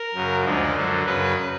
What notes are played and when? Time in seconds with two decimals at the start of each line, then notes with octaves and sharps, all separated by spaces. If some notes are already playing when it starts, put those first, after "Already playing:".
Already playing: A#4
0.14 F#2 C#3 F#3
0.44 D2 D3 F3 G#3 C5
0.75 F#2 D3 F#3
1.06 F#2 C#3 F#3 B4